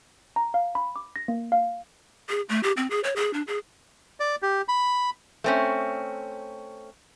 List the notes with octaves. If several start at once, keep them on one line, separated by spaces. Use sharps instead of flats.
A#5
F5
B5
D6
A#6
A#3
F5
G#4
A3
G4
C4
G#4
C#5
G#4
D4
G#4
D5
G4
B5
A3 C4 C#4